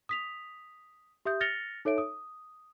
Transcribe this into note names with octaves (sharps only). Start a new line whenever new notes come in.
D#6 B6 F7
G4 E5 D#6 G6
F6 A6 A#6 C#7 F7 G7
D#4 A4 C#5 E5 D7
D#6